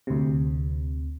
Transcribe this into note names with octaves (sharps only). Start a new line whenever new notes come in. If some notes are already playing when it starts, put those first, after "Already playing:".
D2 C3